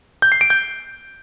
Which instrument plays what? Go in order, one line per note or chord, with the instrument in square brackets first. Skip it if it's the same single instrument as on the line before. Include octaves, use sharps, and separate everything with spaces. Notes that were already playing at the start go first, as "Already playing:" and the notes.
[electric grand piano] G6
C7
D7
G6